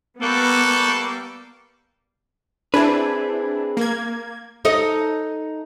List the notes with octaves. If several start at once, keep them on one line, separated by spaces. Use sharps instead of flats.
G3 A#3 B3 A4 C#6 F#6 G6
C4 D4 E4 G#4 B4
A#3 G#6
D#4 A4 D#5